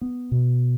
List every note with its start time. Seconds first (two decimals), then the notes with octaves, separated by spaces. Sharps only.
0.01 B3
0.31 B2